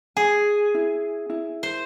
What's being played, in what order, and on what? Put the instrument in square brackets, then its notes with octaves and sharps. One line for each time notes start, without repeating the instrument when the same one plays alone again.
[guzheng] G#4 [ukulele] G#5
[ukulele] E4
E4
[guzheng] C5